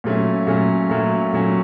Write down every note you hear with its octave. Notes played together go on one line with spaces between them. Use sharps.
A#2 F#3 A3 C#4
A#2 F#3 A3 C#4
A#2 F#3 A3 C#4
A#2 F#3 A3 C#4